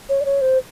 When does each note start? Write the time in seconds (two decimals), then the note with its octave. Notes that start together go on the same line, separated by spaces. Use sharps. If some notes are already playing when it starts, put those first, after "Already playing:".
0.09 C#5
0.21 D5
0.25 C#5
0.41 C5